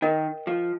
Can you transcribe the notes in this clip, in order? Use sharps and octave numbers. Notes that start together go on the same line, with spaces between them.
D#3 A#4 D#5 G5
F3